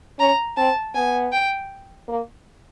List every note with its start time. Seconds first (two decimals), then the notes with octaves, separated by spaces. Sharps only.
0.19 C#4 A#5
0.57 C4 A5
0.95 B3 G#5
1.33 G5
2.08 A#3